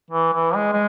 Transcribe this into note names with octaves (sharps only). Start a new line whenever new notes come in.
E3
E3
G#3
G#3